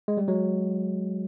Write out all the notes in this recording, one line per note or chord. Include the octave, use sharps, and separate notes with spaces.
G#3
G3
F#3 G#3